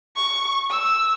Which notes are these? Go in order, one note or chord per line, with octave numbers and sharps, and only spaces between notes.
C#6
E6